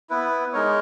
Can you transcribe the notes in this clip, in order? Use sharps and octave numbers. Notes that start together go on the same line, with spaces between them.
B3 E4 B4
G#3 D#4 A#4 C#5